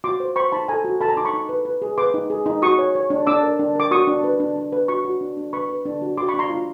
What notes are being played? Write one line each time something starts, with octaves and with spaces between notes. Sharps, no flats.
F#4 C6 D6
C5
C5 B5 C#6
D#4 A5 B5
A4 G#5 A#5
F#4
A4 A5 B5
G#5 A#5
D#4 C6 D6
B5 C#6
D#4
B4
B4
G#4
B4 C6 D6
D#4
G#4
D#4
F#4 C#6 D#6
C#5
C#5
D4
D4 D6 E6
A#4
D4
A#4 D6
F#4 C#6 D#6
D4
B4
D4
D4
B4
F#4 B5 C#6
F#4
D4
D4
B4 B5 C#6
B4
D4
F#4
F#4 C6 D6
B5 C#6
D4
A#5 C6
F4